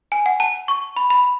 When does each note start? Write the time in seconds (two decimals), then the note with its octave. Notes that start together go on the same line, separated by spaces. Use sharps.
0.12 G#5
0.26 F#5
0.40 A5
0.68 C#6
0.96 B5
1.10 B5